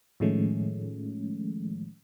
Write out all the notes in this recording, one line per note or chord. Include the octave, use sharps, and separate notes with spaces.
A2 D#3 F3 G#3 A3 C#4